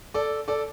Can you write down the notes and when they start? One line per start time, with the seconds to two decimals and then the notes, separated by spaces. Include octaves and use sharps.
0.14 A4 D5
0.48 A4 D5